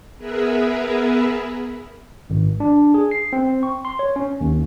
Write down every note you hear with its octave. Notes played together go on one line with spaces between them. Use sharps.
B3 G#4 A#4 B4 E5
G#1
D4
G#4
C7
C4
C#6
C6
C#5
C#4
D#2